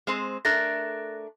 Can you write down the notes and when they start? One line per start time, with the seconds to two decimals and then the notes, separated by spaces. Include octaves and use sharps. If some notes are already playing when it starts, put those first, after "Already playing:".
0.07 G#3 C4 C5
0.45 A3 D4 A#4 F#6 A6 A#6